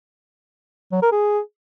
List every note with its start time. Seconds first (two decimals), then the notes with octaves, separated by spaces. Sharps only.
0.92 F#3
1.02 A#4
1.12 G#4